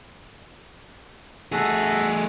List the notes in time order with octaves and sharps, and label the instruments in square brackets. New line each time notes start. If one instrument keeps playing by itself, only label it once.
[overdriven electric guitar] A3 G#4 [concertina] F#4 A4 E5